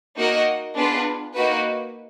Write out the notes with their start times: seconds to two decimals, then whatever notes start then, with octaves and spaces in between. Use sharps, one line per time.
0.17 A#3 D#4 F#4 A#4 D#5
0.75 B3 D4 F4 G#4 B4
1.34 A#3 D#4 F#4 B4